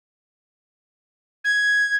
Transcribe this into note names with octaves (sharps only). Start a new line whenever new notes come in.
G#6